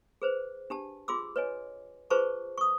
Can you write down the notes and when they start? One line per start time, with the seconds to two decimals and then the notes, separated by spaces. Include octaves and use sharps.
0.22 G#4 B4 C5
0.70 D4 G4 A5
1.08 F4 G#4 C6 D6 E6
1.36 B4 C#5 D#5 G#5
2.10 F4 G#4 B4 C5 A5 C#6
2.58 C#6 D#6